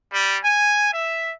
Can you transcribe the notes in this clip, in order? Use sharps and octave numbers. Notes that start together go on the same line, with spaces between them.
G3
G#5
E5